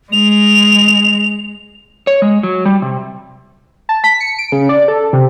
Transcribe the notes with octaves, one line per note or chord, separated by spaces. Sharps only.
G#3 F7
C#5
G#3
F#3
G3
C3
A5
B6
C#7
D7
C#3
D5
A4
C3